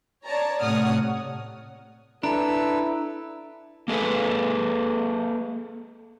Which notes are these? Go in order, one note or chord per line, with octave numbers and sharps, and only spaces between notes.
C#5 D5 A5 A#5
A2 C3 C#5 F#5 D#6 F6
D4 E4 A4 B4 A#5 E6
A#3 G#4 A4 B4